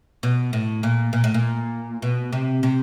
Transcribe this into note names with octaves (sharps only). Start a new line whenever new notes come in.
B2
A2
A#2
A#2
A2
A#2
B2
C3
C3